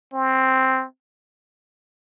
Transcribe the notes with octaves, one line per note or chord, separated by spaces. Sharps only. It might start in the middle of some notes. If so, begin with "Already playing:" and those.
C4